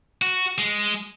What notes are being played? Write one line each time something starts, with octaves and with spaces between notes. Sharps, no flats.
F#4
G#3